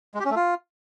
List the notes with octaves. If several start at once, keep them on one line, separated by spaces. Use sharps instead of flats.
G#3
G4
C#4
A3
F4